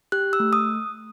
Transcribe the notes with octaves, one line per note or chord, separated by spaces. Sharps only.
G4 F#6
E6
A3
D#6